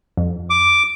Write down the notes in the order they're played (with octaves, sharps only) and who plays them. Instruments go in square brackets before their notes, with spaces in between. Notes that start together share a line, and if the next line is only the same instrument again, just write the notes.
[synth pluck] F2
[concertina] D6